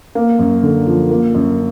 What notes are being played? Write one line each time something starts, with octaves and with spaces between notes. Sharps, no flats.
A#3
F#2
D3
F3
A#3
F#2